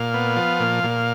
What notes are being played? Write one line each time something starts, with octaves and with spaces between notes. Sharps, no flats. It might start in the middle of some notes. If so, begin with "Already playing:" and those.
Already playing: A#2 F5
B3
F3
A#2
A#2